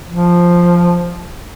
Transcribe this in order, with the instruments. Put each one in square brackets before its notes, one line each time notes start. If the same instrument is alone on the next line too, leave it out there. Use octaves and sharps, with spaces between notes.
[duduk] F3